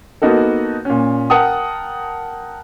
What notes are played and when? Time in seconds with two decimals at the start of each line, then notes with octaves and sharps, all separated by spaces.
0.22 A#3 B3 D#4 F#4 A4
0.85 A#2 C#4
1.30 A#4 F#5 G5 A5 D#6